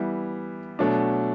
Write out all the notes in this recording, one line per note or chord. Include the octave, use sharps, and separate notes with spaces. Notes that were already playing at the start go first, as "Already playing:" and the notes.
Already playing: E3 G3 B3 E4
B2 F#3 A3 D4